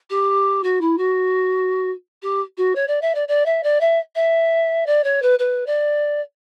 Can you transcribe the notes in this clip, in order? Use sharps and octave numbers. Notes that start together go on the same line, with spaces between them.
G4
F#4
E4
F#4
G4
F#4
C#5
D5
E5
D5
D5
E5
D5
E5
E5
D5
C#5
B4
B4
D5